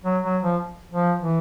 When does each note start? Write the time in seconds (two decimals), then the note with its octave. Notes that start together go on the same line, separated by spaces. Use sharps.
0.04 F#3
0.24 F#3
0.43 F3
0.92 F3
1.20 E3